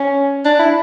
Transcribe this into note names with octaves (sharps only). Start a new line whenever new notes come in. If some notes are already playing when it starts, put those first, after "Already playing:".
Already playing: C#4
D4
E4